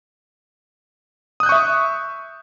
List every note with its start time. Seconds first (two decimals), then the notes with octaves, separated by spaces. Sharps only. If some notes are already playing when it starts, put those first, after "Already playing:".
1.40 D#6
1.43 F#6
1.46 G6
1.49 C#6
1.52 E5